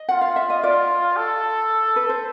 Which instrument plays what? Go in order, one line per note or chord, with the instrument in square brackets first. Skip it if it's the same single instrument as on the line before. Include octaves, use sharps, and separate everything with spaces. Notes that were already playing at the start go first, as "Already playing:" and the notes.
Already playing: [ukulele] D#5
[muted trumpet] F4 [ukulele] F#5
[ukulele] F5
E5
D#5
[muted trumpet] F4 [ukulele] D5
[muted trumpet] A4
[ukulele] B4
C5